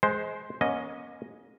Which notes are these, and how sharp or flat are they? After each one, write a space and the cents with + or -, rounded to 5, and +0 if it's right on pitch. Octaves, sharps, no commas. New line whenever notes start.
G#3 +20 C5 +0
A#3 +45 C#4 +0 D#5 +0